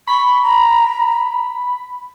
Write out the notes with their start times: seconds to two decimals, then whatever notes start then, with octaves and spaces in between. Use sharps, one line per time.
0.07 B5 C#6
0.43 A#5